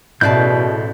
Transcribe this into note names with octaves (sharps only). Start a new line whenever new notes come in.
A1 B2 A3 G#4 D5 A5 F#6 G6